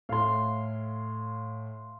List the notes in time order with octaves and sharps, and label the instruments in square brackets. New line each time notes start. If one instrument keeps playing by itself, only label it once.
[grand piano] A2 [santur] F5 C6